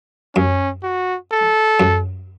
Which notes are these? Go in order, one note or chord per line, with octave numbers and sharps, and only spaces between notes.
F#2 C#4
F#4
A4
F#2